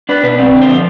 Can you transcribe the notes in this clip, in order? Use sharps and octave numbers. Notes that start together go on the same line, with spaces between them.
D4 B4
B2 B4
C4 D5
D3
C5
F3